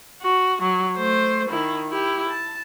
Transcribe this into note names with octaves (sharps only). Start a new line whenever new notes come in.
F#4
F#3
A3 C5
D#3 E4
E4 G4
A5